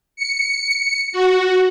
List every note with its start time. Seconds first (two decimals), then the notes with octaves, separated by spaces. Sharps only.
0.16 C#7
1.12 F#4